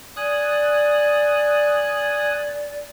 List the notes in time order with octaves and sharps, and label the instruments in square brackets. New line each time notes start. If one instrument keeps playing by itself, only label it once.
[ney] D5 [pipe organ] G#5 D#6 F#6